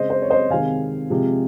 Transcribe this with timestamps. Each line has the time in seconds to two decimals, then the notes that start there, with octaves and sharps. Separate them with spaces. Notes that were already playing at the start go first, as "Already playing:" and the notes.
Already playing: C#3 G#3 C5 D#5
0.10 C5
0.22 C#5
0.30 C5 D#5
0.50 C3 D#3 G#3 F5 G#5
1.10 C3 F3 G#3